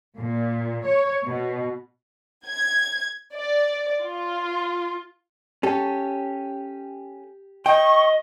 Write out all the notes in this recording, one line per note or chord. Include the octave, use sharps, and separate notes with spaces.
A#2
C#5
B2
G#6
D5
F4
C#4 G4 A4
D#5 G5 C#6